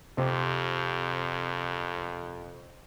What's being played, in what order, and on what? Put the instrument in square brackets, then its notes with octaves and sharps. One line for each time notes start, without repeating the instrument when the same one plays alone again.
[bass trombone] F2 [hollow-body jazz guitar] C3